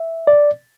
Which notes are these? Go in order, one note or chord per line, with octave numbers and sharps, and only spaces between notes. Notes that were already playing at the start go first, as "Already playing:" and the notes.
Already playing: E5
D5